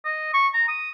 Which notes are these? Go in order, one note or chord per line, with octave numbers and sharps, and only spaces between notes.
D#5
C#6
A#5
D#6